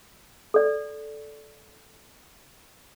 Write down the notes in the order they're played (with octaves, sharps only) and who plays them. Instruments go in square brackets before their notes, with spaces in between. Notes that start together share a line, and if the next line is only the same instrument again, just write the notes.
[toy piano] A4 D5